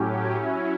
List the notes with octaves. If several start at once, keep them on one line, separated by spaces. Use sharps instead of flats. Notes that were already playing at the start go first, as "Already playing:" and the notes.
Already playing: A2 F#3 C#4 G4
F#3 C#4 E4